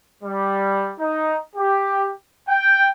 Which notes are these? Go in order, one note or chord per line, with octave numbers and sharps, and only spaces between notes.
G3
D#4
G4
G5